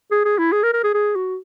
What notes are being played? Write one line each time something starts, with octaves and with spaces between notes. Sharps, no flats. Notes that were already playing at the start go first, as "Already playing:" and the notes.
G#4
G#4
E4
G#4
A#4
A#4
G#4
G#4
F#4